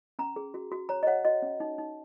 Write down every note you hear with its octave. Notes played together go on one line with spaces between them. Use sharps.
C#4 A#5
G#4
F#4
F#4
C#5 A#5
D#5
C#5 F#5
F#4 D#5
C#4
D#4
D#4